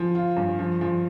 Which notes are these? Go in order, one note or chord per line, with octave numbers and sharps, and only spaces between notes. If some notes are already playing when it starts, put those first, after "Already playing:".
Already playing: F3
F4
G2
F3
F3